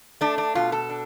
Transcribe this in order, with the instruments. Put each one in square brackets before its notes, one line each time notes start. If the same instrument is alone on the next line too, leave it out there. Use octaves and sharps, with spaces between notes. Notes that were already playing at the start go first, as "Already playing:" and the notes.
[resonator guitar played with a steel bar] A3 D4
D4
B2 F4
A4
D4